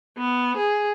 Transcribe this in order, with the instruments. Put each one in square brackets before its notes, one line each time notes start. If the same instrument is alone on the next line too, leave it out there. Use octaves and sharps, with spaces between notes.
[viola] B3
G#4